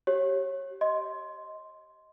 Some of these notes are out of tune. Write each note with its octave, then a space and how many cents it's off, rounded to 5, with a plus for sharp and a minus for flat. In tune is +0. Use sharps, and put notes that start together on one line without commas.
G4 -30 C#5 -20
D#5 +15 C6 +0